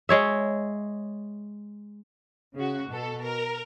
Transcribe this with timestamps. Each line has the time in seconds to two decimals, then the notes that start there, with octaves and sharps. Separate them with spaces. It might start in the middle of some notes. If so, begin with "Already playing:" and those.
0.09 G#3 C#5 E5
2.55 C#3 F#4
2.90 B2 A4
3.23 A#4